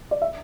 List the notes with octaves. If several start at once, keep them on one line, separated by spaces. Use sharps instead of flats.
D5
E5